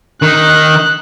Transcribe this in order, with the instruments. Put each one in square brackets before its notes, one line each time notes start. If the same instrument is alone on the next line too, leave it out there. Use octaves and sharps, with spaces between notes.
[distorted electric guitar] D#3 [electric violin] F#6